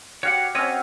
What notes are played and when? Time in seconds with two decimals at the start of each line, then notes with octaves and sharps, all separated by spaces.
0.23 F#4 G4 C#5 F5 F#5
0.55 C4 C#4 C#5 D#5